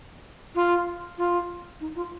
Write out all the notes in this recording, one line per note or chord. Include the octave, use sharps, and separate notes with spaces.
F4
F4
D#4
F4